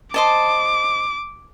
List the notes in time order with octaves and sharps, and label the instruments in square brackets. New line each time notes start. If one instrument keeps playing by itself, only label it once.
[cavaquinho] C5 D#5 A5 [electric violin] D6